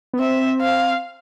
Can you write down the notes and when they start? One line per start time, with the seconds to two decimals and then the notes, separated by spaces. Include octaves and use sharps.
0.13 B3
0.19 C4 E5
0.61 F5